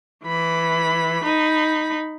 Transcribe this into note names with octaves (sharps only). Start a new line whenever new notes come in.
E3 B5
D#4 B5